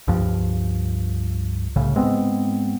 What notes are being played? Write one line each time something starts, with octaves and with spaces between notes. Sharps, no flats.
C#2 G2 F3
C2 A2 C#3
G#2 G#3 B3 C4